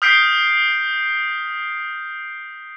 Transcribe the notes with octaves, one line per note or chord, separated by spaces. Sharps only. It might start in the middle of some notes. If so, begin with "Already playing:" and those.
D#6 F6 G6 B6 C7 D7